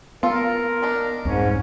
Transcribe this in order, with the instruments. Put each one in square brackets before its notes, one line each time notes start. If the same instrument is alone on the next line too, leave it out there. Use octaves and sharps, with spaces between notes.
[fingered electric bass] B3 [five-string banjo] F4 A4 [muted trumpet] A#4
[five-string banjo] D4 D#4
[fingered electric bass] C2 F2 [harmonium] G#2 [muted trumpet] C#4